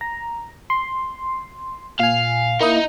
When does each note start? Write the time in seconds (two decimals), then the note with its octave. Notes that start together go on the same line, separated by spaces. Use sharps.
0.01 A#5
0.70 C6
1.99 A#2 F5 G#5
2.61 A#3 D#4 E4 D#5